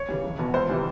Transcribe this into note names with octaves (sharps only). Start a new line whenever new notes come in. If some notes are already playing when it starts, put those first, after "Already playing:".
Already playing: C#5
C#3 E3 G3
F1
E2 B2
C#2 C5
C3 E3 G3